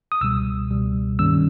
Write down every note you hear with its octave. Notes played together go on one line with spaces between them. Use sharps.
D#6
C#2 B2 G3 E6
C#2 B2 G3
G2 D#3 G3 A#3 C#4 E6